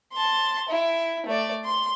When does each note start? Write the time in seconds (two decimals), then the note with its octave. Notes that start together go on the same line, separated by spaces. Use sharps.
0.13 A5 C6
0.69 E4
1.26 A3 D5
1.65 C6